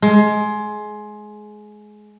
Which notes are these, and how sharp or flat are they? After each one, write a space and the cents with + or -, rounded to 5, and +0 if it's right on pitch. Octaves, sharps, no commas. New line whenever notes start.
G#3 +20